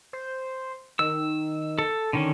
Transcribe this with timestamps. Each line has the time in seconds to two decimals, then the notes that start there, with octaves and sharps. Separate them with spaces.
0.13 C5
0.99 D#3 E6
1.79 A4
2.13 D3 D#3 C#4